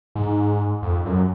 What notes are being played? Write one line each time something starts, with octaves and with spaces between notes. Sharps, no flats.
G#2
F2
F#2